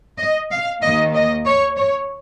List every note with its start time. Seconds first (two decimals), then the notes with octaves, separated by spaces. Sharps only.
0.19 D#5
0.51 F5
0.82 D#2 D#3 A#3 D#5
1.14 D#5
1.46 C#5
1.76 C#5